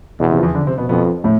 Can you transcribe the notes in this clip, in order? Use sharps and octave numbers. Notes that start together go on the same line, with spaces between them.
E2 B2
C3
F3
E2 E3
D3 D4
C3 C4
B2 B3
F2 B2 B3
A2 A3